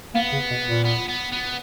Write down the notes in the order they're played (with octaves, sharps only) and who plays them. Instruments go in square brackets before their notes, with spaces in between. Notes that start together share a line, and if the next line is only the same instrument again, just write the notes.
[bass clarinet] A#3 [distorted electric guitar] B3
[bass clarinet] C#3
B2
A#2
[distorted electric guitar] B3
B3
B3